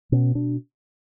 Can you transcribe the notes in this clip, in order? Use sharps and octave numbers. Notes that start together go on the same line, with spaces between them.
B2 C#4
B2 D4